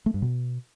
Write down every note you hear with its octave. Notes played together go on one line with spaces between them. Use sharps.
A3
G2
B2